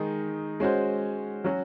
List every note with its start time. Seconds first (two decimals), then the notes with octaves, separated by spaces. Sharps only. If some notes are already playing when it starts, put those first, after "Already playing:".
Already playing: D#3 G#3 D#4
0.60 G#3 C#4 F#4 C5
1.44 F#3 C#4 F#4